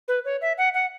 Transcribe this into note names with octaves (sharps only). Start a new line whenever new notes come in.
B4
C#5
E5
F#5
F#5